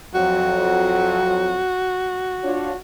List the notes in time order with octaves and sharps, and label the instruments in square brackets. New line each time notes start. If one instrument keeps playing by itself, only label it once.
[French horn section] F2 F#3 [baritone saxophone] F#4
[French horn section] D4 F4 C#5